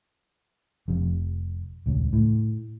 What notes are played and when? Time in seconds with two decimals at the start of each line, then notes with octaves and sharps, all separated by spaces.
0.88 F1 F2 C3
1.86 D#1 C#2
2.13 A2